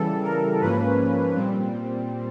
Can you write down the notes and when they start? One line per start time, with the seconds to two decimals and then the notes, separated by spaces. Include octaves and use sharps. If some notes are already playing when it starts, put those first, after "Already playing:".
Already playing: C#3 E3 G3 A4
0.24 A#4
0.61 G#2 F3 A#3 C#4 B4
1.35 A#2 G3 C4